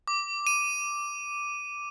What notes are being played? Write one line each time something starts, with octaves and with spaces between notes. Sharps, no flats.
D6
D#7